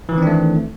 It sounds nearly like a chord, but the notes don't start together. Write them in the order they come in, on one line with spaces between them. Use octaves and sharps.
E3 D#3 C4 D4 A3